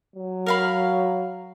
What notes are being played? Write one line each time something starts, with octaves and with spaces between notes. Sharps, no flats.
F#3
A#4 F5 B5